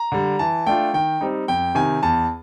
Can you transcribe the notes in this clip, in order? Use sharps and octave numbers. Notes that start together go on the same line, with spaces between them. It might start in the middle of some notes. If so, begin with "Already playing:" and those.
Already playing: A#5
D3 G3
E3 A5
A3 D4 F4 G5
D#3 G5
G3 C4 D#4
F2 G5
C3 D#3 G#5
E2 A5